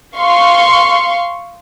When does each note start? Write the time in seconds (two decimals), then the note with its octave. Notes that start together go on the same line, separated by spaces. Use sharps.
0.18 F5 C6 C#6